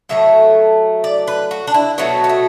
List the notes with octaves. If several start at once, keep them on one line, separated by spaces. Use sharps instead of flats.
A2 F#3 A3 E5
D5
B4
F#4
D4
E4
B2 F#3 A3 B3
B3
A3